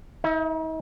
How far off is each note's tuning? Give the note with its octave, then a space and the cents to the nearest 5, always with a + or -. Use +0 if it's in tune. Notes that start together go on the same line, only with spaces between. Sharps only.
D#4 +40 E5 +0